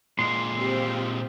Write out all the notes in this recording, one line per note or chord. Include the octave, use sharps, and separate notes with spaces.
A#2 G#3 C6
C4 F4 G4